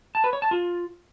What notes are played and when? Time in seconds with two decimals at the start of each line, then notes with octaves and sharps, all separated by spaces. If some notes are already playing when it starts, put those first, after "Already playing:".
0.15 A5
0.24 B4
0.33 C#5
0.42 A5
0.51 F4